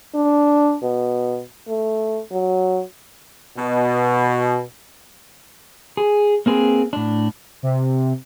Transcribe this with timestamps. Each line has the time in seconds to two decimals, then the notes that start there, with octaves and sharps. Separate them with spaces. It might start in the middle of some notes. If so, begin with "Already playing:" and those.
0.15 D4
0.83 B2
1.68 A3
2.32 F#3
3.57 B2
5.97 G#4
6.46 A#3 C4 G#4 B4
6.93 A2 D4
7.63 C3